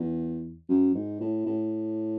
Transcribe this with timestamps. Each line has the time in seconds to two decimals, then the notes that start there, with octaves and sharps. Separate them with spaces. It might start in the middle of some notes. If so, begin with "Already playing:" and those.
Already playing: E2
0.69 F#2
0.94 G#2
1.21 A2
1.46 A2